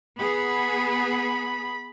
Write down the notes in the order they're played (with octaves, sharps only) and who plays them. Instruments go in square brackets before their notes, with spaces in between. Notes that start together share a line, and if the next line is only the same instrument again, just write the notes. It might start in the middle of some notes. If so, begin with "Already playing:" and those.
[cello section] B3 G#4 [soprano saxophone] B5